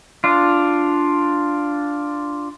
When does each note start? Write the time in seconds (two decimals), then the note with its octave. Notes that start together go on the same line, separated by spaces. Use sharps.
0.24 D4 F4